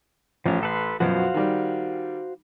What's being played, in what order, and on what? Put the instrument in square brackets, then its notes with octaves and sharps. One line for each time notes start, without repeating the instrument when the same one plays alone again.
[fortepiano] A1 [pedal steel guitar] F3 C#4
[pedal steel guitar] A4 B4 C6
[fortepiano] F#2 B2 F3 [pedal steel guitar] F#4 C5 F5
[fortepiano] D#3 G3